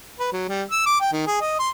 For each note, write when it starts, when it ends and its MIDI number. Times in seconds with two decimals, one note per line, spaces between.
0.20 0.31 71
0.33 0.44 54
0.49 0.63 55
0.71 0.85 88
0.86 0.97 86
1.01 1.11 79
1.13 1.24 51
1.27 1.40 68
1.41 1.59 75
1.59 1.70 84